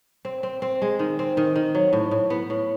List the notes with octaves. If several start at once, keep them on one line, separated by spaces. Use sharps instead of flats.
C4
C4
C4
G#3
D#3
C4
D#3
D#3
F#3
A2
A2
B3
A2